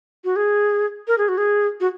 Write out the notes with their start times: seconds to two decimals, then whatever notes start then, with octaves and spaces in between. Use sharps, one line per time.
0.24 F#4
0.36 G#4
1.08 A#4
1.18 G#4
1.28 F#4
1.38 G#4
1.80 F#4